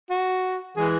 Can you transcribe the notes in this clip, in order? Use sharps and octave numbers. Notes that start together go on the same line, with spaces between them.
F#4
E3 G#3 G#4